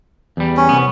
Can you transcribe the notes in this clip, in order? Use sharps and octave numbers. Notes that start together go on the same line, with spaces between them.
E2 G3
C#4
C2 G2 B3